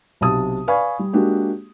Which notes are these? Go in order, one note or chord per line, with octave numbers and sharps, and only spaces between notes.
B1 C3 A5 D#6
B4 D5 F5 G#5 B5 C#6
G3
G#3 A#3 D4 F#4 G4